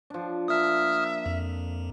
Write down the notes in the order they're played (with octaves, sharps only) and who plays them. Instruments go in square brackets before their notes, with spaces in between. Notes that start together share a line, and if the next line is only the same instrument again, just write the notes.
[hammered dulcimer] F3 D4
[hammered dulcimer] A#3 [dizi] E5 [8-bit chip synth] D#6 F6
[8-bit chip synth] F2